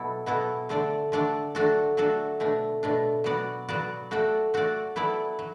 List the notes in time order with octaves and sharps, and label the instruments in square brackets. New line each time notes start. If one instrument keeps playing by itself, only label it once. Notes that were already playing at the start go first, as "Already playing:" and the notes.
Already playing: [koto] B2 F#3 B3 E4 A4
B2 F#3 B3 E4 A4
D3 A3 D4 A4 D5
D3 A3 D4 A4 D5
F#3 A3 D4 F#4 A4
F#3 A3 D4 F#4 A4
B2 A3 D4
B2 A3 D4
F#3 B3 F#4 D5
F#3 B3 F#4 D5
A3 F#4 A4 D5
A3 F#4 A4 D5
F#3 B3 E4 A4 D5
F#3